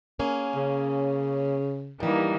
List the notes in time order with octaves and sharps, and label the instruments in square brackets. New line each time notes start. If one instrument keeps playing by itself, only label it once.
[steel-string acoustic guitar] A#3 C#4 G#4
[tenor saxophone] C#3
[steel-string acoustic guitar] G2 G3 [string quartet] E3 A#3 D#4